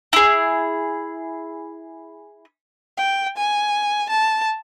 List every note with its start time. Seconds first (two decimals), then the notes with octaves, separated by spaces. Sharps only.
0.13 E4 G#4
2.98 G5
3.37 G#5
4.10 A5